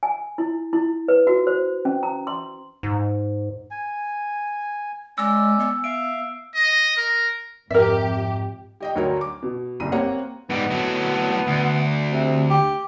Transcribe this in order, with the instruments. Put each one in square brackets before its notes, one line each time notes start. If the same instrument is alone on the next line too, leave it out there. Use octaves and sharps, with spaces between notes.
[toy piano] G#5
E4
E4
B4
F#4
C5
C#4
A#5
C6
[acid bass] G#2
[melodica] G#5
[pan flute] G#3 [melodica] C#4 D5 [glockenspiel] E6
[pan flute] B3
[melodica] E5 F5 [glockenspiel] D7
[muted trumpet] D#5
A#4
[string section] F2 G4 [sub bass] G#2 [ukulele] A#4 E5
[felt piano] G4 D#5 G5
D2 F#3 A#4 C#5
D6
B2
F#1 C2 D#7
A#3 C4 G4 C#5 F#5
[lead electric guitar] G#2 G3 [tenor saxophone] B3
[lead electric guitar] A2 F#3
D2
[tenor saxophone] C3
G4